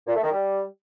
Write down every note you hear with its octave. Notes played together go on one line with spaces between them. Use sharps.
A#2
A3
D#3
G3